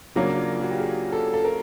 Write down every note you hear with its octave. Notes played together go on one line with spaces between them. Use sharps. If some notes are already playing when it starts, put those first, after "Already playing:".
C#3 F#3 A#3 C#4 D4
F4
F#4
G4
G#4
A4
A4
A#4